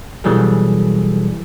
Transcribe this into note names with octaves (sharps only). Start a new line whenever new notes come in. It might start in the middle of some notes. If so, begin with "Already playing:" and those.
B2 E3 F#3 G3 G#4 A4